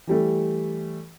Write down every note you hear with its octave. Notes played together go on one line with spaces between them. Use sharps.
E3 G3 A3